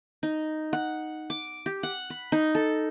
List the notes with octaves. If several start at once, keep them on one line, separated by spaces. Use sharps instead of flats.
D#4
F#5
D6
G4
F#5
B5
D#4
A4